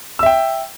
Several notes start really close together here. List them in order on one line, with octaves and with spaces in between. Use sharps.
E6 E5 G5